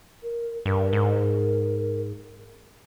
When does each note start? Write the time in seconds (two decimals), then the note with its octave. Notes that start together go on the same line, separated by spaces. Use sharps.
0.23 A#4
0.66 G2 A#4
0.93 G#2